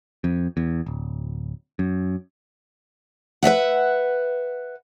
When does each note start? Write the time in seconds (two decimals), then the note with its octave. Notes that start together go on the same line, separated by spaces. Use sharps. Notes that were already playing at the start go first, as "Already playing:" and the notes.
0.24 F2
0.57 E2
0.86 D1
1.79 F#2
3.43 B4 D#5 E5 F#5